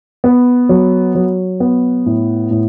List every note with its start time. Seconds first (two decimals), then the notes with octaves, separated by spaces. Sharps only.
0.24 B3
0.69 F#3
1.15 F#3
1.60 B3
2.06 A2
2.51 A2